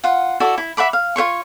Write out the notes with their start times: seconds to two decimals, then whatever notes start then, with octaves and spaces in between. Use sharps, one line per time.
0.04 F4 F#5
0.40 E4 F#4 A4 D5
0.58 E4
0.77 E5 F#5 B5 D6
0.93 F5
1.16 F4 C5 C#5 C#6